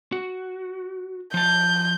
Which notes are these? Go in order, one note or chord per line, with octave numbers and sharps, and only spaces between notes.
F#4
F3 A5 G6